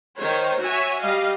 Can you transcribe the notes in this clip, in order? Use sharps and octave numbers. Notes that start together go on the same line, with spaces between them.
D#3 C5 C#5
F#4 C#5 E5 G#5
G3 D#5 F5